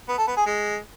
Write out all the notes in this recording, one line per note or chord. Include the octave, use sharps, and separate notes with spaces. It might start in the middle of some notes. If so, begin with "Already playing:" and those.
B3
A4
B3
G#4
G#3